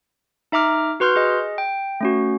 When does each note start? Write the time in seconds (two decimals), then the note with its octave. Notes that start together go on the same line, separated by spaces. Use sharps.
0.52 D#4 E5 A#5 D6 F6
1.00 F#4 B4 C6 F6 G6
1.16 G#4 D#5
1.58 G5
2.01 A3 C#4 F#4